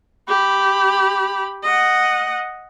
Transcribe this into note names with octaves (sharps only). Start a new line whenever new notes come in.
G4 B5
D#5 F#5